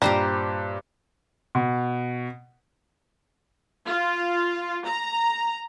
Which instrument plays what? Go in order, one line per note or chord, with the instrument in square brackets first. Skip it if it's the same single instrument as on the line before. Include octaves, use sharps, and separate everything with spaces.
[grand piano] G2 A#2 [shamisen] G3 [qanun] G4 C5 A#5
[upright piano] B2
[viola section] F4
A#5